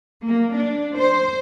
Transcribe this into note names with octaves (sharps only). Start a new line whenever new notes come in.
A#3
D4
C5